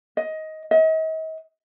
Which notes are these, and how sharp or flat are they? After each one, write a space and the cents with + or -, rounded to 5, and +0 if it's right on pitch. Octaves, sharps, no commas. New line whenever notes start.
D#5 +15
D#5 +40